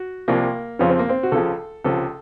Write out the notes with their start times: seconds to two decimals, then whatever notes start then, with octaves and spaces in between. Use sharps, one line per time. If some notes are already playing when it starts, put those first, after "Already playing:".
Already playing: F#4
0.28 C2 C3 F3 A#3
0.79 F2 C#3 F3 C#4
0.89 C4
0.99 A#3
1.09 C4
1.23 F#4
1.32 C#2 C#3 F3 A4
1.84 C#2 C3 F3 A4